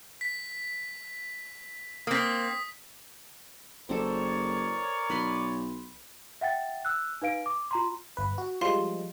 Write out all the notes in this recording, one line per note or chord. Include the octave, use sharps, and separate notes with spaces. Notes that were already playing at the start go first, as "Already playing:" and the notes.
B6
A#3 C4 D#6 B6
F#1 C4 A4 A#4 C#5 D5
B1 B4 B5 C6
E5 F#5 G5 A6
E6 F#6
D#4 B4 F5 D7
D6
F4 A#5 C6
G1 B4
F#4
F3 G3 G#3 F5 C6